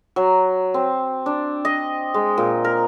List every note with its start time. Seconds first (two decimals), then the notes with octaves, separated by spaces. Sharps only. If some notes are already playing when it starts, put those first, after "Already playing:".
0.16 F#3
0.74 C4
1.26 D4
1.65 D#5
2.14 G#3
2.38 A#2
2.64 A#4